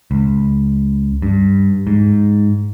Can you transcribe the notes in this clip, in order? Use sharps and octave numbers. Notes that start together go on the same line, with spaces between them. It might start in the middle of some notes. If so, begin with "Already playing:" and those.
C#2
G2
G#2